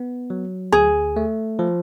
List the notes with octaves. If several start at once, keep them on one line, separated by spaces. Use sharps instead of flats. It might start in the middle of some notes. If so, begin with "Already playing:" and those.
Already playing: B3
F#3
D2 G#4
A3
F3